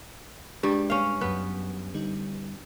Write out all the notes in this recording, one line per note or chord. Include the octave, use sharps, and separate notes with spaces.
G2 G3 G#3 D4
C#4 F5
F#2 F#3 B3 B4
D3 G3 D#4